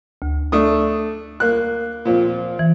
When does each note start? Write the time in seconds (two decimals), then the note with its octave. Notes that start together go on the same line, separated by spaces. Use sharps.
0.22 D2
0.52 A3 D4 D#6
1.40 A#3 F#6
2.05 A#2 F3 C4
2.59 E3